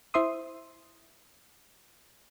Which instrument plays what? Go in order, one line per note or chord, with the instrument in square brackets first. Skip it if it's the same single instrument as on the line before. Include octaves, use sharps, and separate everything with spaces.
[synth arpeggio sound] E4 C5 E5 C6 D#6